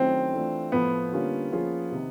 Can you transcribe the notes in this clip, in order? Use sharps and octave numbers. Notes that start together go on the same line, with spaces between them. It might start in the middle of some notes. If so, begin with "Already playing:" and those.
Already playing: D#3 F#3 A3 C4 C#4 E4
E3 A3 D4 F4
A2 F3 A3 B3
D3 G3 A#3 C#4 F4
F3 A#3 C#4 F4 G#4
C3 D#3